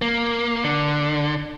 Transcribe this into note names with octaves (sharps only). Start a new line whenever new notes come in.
A#3
D3